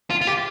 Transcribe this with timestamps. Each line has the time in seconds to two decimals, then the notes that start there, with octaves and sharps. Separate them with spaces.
0.10 F4
0.21 F4
0.27 G4